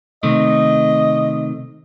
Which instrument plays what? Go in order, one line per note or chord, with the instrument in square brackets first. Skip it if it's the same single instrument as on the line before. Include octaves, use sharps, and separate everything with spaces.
[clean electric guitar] C3 D#3 A3 [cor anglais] D#5